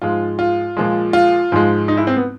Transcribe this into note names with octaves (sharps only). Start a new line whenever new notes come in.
G#2 F3 G#3 F4
F4
A#2 F3 G#3
F4
G#2 F3 G#3
D#4
E4
C4
B3